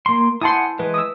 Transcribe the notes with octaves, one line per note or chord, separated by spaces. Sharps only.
A#3 C6
E4 F#5 G#5 A5 C6 D#6
E3 G#3 B4
D#6 E6